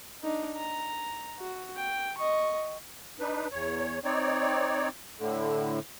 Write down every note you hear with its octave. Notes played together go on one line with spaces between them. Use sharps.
D4 D#4
A#5
F#4
G5
D#5 C#6
D4 D#4 B4
E2 C#5
C4 D#4 C#5 D5
A2 D3